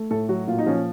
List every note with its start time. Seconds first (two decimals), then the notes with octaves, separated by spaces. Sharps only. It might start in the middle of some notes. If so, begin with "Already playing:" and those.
Already playing: A3
0.11 A2 A4
0.29 F#3 F#4
0.48 A#2 F4
0.59 D#4
0.66 F3 C#4